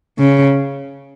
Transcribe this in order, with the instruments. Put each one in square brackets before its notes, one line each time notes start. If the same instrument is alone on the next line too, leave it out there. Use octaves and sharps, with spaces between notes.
[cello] C#3